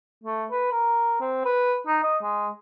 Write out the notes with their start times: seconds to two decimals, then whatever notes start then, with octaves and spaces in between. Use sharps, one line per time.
0.24 A3
0.51 B4
0.72 A#4
1.20 C4
1.45 B4
1.87 D#4
2.03 D#5
2.23 G#3